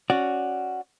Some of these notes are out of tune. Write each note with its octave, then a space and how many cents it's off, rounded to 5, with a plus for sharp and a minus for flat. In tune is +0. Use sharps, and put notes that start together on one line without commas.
C#4 +0 F#4 +0 D5 +0